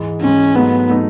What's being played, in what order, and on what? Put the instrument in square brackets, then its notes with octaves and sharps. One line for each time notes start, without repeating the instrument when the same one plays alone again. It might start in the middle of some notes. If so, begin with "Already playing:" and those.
Already playing: [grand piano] G#2 E3 G#3
[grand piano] G#2 E3 G#3 [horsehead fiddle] C#4
[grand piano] G#2 F#3 A3 D#4 [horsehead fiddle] B3
[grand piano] F#3 A3 D#4